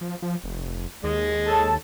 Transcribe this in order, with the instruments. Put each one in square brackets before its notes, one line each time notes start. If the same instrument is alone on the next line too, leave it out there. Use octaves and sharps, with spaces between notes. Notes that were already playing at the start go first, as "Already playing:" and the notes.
[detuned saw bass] F3
F3
F1
[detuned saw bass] D#2 [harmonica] G#3 D#5
[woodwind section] A4 C#5 A5